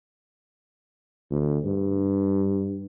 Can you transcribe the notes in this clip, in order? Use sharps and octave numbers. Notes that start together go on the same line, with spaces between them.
D2
G2